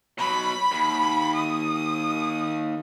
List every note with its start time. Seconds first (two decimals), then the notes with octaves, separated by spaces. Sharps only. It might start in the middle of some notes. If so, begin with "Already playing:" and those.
0.19 B2 F#3 B5
0.72 D#2
1.36 D#6